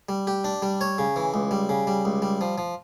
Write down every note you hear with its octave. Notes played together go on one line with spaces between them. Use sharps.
G3
G4
D4
G3
C#5
C#3
E3
C#2
G3
C#3
G3
C#2
G3
F3
F3